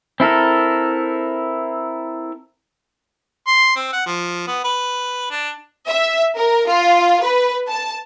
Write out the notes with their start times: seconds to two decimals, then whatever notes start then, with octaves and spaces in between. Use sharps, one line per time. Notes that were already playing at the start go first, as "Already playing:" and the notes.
0.20 C4 E4 A4 A#4
3.47 C6
3.76 C4
3.93 F#5
4.06 F3
4.47 B3
4.64 B4
5.31 D4
5.89 E5
6.37 A#4
6.67 F4
7.22 B4
7.69 A5